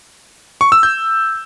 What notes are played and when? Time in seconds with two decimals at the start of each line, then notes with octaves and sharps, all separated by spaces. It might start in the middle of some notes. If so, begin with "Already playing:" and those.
0.61 C#6
0.72 E6
0.83 G6